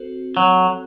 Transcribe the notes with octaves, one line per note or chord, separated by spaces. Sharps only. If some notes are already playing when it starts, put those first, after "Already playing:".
Already playing: C4 F#4 A4 C5
F#3